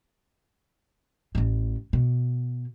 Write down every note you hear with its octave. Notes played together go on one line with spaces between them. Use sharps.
A1 A2
B2